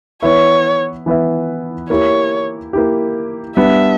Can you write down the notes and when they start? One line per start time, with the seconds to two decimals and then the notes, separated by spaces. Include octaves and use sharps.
0.23 E3 B3 E4 B4 C#5 E5
1.06 E3 B3 E4 B4 E5
1.90 A#3 E4 G4 C#5
2.73 A#3 E4 G4
3.57 G3 B3 D4 E5